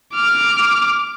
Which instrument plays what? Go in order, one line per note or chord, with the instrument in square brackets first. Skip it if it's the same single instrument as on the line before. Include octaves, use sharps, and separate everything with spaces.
[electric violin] D6 F6